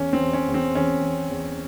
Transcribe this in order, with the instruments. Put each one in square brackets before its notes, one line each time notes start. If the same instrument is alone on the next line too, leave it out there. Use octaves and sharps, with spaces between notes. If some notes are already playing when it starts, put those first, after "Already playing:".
Already playing: [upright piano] E2 C#4
C4
E2
C#4
E2
C4
E2 C#4
E2
E2